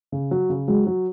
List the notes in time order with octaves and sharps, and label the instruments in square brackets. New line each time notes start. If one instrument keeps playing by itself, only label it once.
[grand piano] C#3
F#3
C#3
[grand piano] F#3 [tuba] G#3
[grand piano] F#3